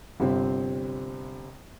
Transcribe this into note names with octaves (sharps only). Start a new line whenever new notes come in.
G1 C3 C4